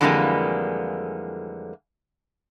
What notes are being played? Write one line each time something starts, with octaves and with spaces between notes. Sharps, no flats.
F2 D3 E3 G3 G#3 A#3